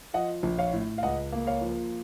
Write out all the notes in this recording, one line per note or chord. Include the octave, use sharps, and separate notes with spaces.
F3 D#5 F#5
A#1
C#5 F5
A2
F5
C#2 D#5 F#5
A#3
C#5 F5
F3